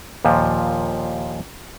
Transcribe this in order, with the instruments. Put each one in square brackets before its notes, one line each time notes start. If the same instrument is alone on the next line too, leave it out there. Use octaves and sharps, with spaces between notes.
[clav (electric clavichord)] D#2 A#2 F3